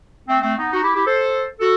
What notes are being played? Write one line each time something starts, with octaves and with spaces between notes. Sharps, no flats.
A3 C4
A3 C4
B3 D#4
D#4 F#4
E4 G4
E4 G4
A4 C5
F#4 A4